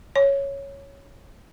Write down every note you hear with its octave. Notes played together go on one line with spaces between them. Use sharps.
C#5